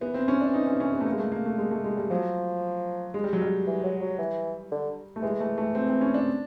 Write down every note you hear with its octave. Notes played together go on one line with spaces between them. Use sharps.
E3 B3
C4
C#4
D4
D#4
C#4
C#4
B3
A3
A#3
G#3
A3
A#3
A3
G#3
A3
G#3
G3
F3 F#3
G#3
G3
F#3
G3
E3
F#3
F#3
E3
D3
A3
E3 G#3
A3
A3
C4
C4
C#4
D4